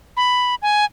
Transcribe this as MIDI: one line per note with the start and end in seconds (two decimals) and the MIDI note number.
0.17 0.55 83
0.62 0.85 80